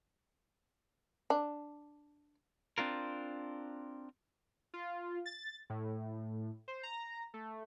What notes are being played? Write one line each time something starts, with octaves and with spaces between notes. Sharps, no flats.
D4
C4 D4 F4 A#4
F4
A6
A2
C5
A#5
A3